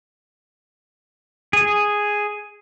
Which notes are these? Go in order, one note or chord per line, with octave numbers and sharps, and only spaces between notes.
G#4